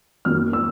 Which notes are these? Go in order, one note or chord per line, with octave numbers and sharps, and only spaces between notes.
F#2 D#3 F#3 A#3 F6
E6